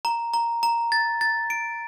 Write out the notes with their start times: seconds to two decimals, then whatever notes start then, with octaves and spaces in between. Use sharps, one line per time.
0.05 A#5
0.34 A#5
0.63 A#5
0.92 A6
1.21 A6
1.50 D7